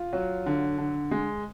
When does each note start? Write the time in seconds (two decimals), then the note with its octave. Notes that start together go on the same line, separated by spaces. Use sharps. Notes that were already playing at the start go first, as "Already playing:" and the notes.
Already playing: F4
0.13 F#3
0.46 D3
0.78 D3
1.11 G#3